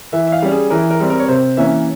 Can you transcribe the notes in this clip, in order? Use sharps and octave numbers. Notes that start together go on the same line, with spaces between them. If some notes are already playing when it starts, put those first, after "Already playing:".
E3 E5
E5
F5
G3 C#4
G#4
E3 A#4
A#4
G3 C4
A#4
C#5
C3 C5
E3 A#3 C#4 E5